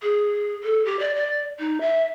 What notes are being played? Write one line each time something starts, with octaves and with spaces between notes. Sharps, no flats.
G#4
A4
G4
D5
D5
D#4
E5